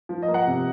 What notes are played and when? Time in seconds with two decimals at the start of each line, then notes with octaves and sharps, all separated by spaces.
0.09 F3
0.22 D#5
0.28 A#3
0.34 F#5
0.47 C3